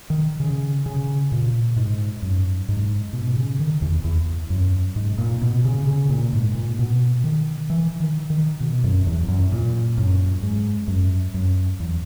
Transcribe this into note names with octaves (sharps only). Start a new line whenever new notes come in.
D#3
C#3
C#3
A#2
G#2
F#2
G#2
B2
C#3
D#3
E2
E2
F#2
G#2
A#2
B2
C#3
C#3
A#2
G#2
A#2
B2
D#3
E3
D#3
D#3
B2
F#2
E2
F#2
A#2
F#2
G#2
F#2
F#2
E2